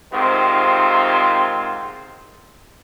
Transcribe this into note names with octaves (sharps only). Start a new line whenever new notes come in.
G#2 C3 D#3 C4 F4